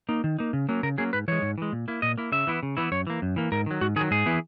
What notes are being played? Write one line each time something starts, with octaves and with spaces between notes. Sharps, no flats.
A#3 D#4
D#3
A#3 D#4
C#3
F#3 A#3 C#4
C#3 A#4
F#3 A#3 C#4 G#4
G#2 B4
E3 G#3 C#5
G#2
E3 G#3
A#2
A#3 E4
A#2 D#5
A#3 E4
C#3 E5
E3 B3 E4
C#3
E3 B3 E4
F#2 C#5
E3 A#3
F#2
E3 A#3
G#2 A#4
D#3 F#3
G#2 F#4
D#3 F#3 G#4
G#2 G#4
E3 B3 E4